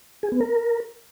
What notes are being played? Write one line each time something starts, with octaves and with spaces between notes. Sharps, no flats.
G#4
B3
A#4